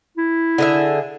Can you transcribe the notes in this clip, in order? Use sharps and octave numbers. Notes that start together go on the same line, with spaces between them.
E4
D3 G#4 E5